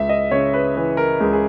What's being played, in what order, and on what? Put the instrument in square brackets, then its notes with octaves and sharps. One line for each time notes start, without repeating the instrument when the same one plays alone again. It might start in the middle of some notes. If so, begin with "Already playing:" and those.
Already playing: [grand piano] C#2 E5
D#5
C#3 C#5
B4
E3 B4
A#4
C#2 G#4
G#4